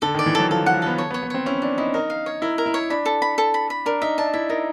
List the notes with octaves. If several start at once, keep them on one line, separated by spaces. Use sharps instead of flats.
D3 A4
D#3
D5
E3
F#3 A4
F3 A4
F3
F#5
F3
B3 A4
C#5
B3
C#5
B3
C4 C#5
C#4 E4
D4 E4
D#4 E4
D#4 A#4
F5
C#5
E4 A#4
A#4
E4
C#5
D4 B5
A4
B5
A4
B5
B5
D4 A#4
D#4 E5
D4 A5
E4 E5
D#4 A#4